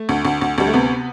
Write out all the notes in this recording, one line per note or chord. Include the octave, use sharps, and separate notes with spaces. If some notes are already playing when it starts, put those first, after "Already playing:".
Already playing: A3
D2
D2
D2
D2 G3
A3
C3 B3